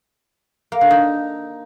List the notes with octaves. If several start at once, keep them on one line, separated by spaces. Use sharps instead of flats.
A#3
D3
D#4